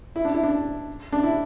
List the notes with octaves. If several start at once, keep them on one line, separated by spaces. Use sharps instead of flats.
E4
D4
E4
D4
D4
E4